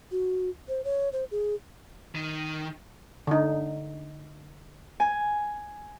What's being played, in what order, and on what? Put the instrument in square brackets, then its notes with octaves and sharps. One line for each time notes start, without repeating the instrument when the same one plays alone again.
[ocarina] F#4
C5
C#5
C5
G#4
[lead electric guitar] D#3
[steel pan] D3 D#4
[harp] G#5